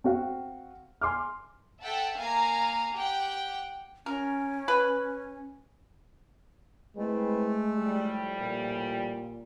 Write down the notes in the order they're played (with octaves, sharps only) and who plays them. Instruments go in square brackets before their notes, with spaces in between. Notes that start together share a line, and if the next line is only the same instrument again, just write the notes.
[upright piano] C4 F#4 F5
G#5 C6 D6 F6
[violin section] A4 E5 F#5 G5 A5
A#3 F5 G#5 A#5
G4 F#5 G5
[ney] C#4 [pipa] A#4
[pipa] B4
[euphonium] G#3 [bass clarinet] A3 [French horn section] C4 E4 B4
[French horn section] A2 F3 G3
[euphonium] A#2